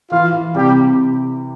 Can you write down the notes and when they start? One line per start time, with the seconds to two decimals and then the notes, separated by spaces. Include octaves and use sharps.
0.11 E3 F4 F5
0.33 E3
0.55 C3 G3 G4
0.77 C3